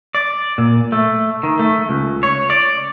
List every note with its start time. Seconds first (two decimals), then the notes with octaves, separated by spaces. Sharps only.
0.15 D5
0.58 A#2
0.92 A3
1.43 D#3
1.59 A3
1.89 C#2
2.23 C#5
2.50 D5